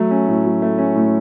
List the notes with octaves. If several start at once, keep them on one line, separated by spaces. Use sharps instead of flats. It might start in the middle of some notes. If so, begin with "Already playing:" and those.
Already playing: F#3 A3
C#4
A2
F#3
A3
C#4
A2